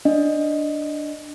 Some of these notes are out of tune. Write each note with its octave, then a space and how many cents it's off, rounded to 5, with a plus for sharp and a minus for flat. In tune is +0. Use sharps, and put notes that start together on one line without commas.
D4 +0 D#5 +0